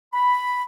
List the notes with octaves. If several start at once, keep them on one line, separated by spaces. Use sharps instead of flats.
B5